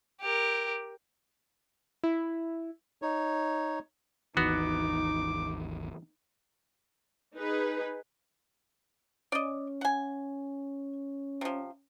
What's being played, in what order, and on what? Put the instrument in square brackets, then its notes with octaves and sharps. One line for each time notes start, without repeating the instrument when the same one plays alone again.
[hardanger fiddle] G4 A#4
[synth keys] E4
[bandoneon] D#4 C#5
[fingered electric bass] G#1 D#2 E3 [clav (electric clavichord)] B3 F#4 [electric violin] D#4 [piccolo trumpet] D6
[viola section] D#4 G#4 B4
[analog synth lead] C#4 [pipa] D5 D#5
[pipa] F#5 G#5
C3 F3